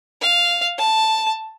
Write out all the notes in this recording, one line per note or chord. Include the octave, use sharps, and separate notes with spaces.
F5
A5